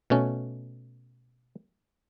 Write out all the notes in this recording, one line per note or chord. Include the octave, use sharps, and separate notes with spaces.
B2 A3 C#4